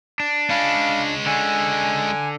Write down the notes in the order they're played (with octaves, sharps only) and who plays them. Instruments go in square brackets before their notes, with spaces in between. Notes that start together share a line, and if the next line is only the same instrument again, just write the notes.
[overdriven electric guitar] D4
[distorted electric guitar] G#3 C#4 [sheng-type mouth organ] F5 B5
[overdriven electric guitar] D3 [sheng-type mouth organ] G#5